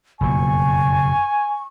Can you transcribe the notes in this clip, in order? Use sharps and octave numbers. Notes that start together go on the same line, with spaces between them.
F#1 F2 B2 G#5 C#6